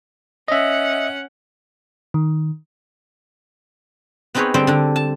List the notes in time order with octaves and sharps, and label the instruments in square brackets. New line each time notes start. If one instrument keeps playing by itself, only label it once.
[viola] C#4 F#5 [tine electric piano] D#5 E5
[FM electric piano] D#3
[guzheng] B3 C4 D#4 G#4 B4 C#5
D3 G3 C4 C5 G5
D3 D4
A5